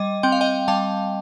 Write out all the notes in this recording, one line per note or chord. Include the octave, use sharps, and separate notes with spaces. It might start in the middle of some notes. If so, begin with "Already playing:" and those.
Already playing: G3 D#5
C4 G5
F5
D#5 G5
G3 F5 A5